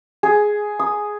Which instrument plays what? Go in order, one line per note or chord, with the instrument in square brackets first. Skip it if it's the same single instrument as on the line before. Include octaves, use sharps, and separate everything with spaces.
[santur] G#4
D#6